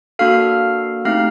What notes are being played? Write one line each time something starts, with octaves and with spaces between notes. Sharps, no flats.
A#3 D4 F#4 A4 F5 F6
A3 C4 D#4 G4 F5 F6